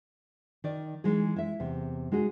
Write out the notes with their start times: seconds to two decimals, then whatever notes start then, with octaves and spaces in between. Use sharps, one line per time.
0.64 D#3 D5
1.04 E3 G#3 D#4 G#4
1.36 E4 E5
1.60 E2 C3
2.12 G#3 D#4 F#4 G#4